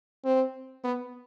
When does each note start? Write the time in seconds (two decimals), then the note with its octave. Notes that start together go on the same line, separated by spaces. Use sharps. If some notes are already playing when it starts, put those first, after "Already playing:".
0.25 C4
0.84 B3